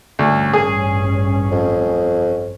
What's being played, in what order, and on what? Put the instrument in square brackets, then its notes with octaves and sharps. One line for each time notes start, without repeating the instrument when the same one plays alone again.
[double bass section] A1 G2 C#4 [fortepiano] D2
[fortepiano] G#4
[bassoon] F2